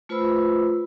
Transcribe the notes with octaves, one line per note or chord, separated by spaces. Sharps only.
A3 F4 B4 C5 B5 E6